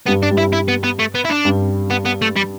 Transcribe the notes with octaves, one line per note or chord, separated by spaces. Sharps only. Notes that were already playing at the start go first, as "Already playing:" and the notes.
G2 G3 B3
D4
G2 G3
E4
E4
B3
B3
A3
B3
E4
D4
G2 G3
B3
B3
A3
G3